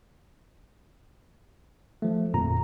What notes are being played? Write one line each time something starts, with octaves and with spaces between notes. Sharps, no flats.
F3 A3
G1 F2 A#2 A#5